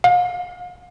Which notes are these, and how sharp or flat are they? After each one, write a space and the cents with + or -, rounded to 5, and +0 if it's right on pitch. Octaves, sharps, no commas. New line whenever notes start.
F5 +40